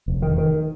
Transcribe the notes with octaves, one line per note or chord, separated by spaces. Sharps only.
F1
D#3
D#3